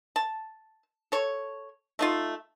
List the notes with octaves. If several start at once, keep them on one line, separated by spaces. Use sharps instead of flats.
A5
A4 C#5
A3 D#4 F4